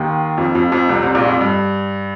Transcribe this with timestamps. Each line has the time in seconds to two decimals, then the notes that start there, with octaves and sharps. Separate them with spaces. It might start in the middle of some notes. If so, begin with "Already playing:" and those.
Already playing: D#2 D#3
0.38 F2 F3
0.55 F2 F3
0.72 F2 F3
0.89 C2 C3
1.02 C2 C3
1.15 A#1 A#2
1.28 F2
1.41 G2